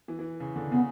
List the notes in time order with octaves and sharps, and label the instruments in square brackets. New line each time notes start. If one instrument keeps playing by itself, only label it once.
[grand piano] E3
E3
C#3
D3
[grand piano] C#3 [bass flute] B3